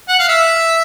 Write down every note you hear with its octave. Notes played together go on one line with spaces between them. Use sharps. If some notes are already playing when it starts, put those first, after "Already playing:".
F#5
F5
E5